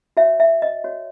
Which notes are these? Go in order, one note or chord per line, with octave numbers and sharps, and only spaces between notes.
F#4 C#5 E5
E5
D#5
F#4 C#5